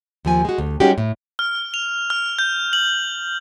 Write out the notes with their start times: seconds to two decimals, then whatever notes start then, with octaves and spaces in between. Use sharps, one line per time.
0.25 D#2 F3 G#5
0.45 G#3 F#4
0.58 D2
0.80 G3 G#3 C#4 D#4 F#4 G4
0.98 A2
1.39 F6
1.74 F7
2.10 F6
2.39 G6
2.73 F#7